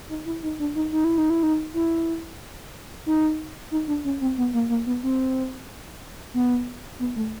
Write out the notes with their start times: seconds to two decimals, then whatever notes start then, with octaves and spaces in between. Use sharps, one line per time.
0.09 D#4
0.26 E4
0.43 D#4
0.60 D4
0.75 D#4
0.92 D#4
1.04 E4
1.18 D#4
1.30 E4
1.43 D#4
1.74 E4
3.06 D#4
3.71 D#4
3.88 D4
4.05 C#4
4.21 C4
4.38 B3
4.54 A#3
4.69 A#3
4.86 B3
5.03 C4
6.34 B3
6.99 B3
7.16 A3